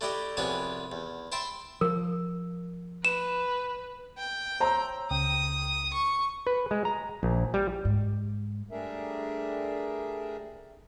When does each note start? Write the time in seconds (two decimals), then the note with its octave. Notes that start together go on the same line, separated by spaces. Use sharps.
0.01 A3 D4 E4 G4 D5 D#5
0.37 C2 F2 B3 D4 G#4 C#5
0.92 E2
1.32 C5 E5 G5 A5 B5 C6
1.81 F3 A#4
3.05 B4 E7
4.18 G5
4.60 C5 C#5 A#5 E6
5.10 C#2 C#3 G5 D#6
5.93 C#6
6.47 B4
6.71 G#3
6.85 A#5
7.23 A#1
7.54 G3
7.85 G#2
8.71 G3 A3 D4 G#4 A#4 E5